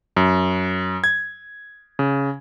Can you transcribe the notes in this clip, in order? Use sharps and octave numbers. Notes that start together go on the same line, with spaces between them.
F#2
G#6
C#3